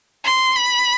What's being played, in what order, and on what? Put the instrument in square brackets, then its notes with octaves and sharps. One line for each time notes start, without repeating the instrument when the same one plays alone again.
[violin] C6
B5